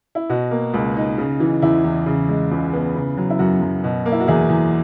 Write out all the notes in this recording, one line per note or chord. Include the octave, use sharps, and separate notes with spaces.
E4
B2 F#4
A#3
C#2
D#4
C#3
E3
E2 E4
E2
C#3
G#3
C#2
B3
C#3
F#3
E4
F#2 F#4
F#2
B2
A#3
E4
F#4
E2 E4 G#4
E2